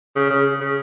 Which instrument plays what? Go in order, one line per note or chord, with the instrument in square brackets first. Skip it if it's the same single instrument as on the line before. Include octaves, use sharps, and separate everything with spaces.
[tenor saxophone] C#3
C#3
C#3